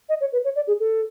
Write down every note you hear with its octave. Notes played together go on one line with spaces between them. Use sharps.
D#5
C#5
B4
C#5
D5
G#4
A4